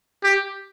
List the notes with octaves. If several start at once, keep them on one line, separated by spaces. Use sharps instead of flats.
G4